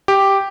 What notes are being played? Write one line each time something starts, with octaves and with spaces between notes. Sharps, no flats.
G4